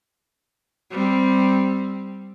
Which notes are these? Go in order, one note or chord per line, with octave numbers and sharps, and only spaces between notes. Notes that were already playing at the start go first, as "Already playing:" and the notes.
G3 C4